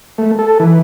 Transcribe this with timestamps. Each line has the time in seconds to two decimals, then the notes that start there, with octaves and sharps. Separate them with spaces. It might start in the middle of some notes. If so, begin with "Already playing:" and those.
0.18 A3
0.39 A4
0.60 E3